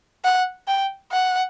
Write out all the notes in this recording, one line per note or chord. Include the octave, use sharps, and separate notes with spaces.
F#5
G5
F#5